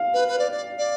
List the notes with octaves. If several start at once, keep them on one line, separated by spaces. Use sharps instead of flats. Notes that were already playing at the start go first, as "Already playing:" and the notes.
Already playing: F5
B4
B4
D5
D5
D5